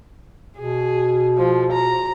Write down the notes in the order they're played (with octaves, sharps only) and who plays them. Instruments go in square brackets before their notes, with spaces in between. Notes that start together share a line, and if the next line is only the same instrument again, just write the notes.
[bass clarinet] B2 [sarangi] G#4
[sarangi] F3
A#5